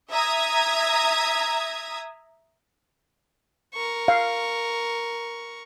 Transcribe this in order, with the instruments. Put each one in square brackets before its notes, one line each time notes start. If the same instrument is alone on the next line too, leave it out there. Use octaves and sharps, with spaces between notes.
[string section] E5 A#5 D#6 G#6
[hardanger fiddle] A#4 C#6
[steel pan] F5